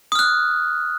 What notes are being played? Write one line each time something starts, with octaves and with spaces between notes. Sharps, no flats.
D#6 F6 F#6